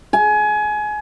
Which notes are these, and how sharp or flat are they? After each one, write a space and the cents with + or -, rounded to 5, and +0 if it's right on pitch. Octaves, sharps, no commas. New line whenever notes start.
G#5 +25